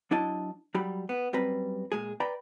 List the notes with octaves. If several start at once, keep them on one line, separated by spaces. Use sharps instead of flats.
F#3 D4 E4 D#5 A5
F#3 G3 G4 B5
B3
F#2 G3 C4 B4 A#5 B5
A#2 G#3 G#4
B4 D5 G5 A#5 B5